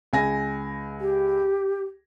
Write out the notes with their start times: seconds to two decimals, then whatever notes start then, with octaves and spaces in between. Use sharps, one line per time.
0.13 C#2 G#5 A#6
1.01 G4